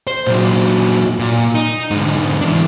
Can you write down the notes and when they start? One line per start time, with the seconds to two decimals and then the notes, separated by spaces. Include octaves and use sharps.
0.07 C5
0.26 A#2 F#3
1.19 A#2
1.55 D#4
1.91 G#2 D3
2.41 E3 D4